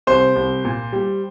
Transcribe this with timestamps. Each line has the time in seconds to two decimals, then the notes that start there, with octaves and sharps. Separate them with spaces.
0.07 C2 C5
0.36 C2
0.64 A#2
0.93 G3